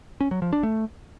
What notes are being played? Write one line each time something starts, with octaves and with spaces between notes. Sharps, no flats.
C#4
F#3
F3
D4
A3